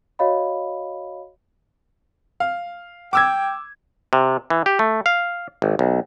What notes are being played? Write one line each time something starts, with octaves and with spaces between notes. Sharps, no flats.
F#4 C#5 D#5 F5 B5
F5
G5 D6 E6 G#6
C3
E3
G4
A3
F5
G#1
B1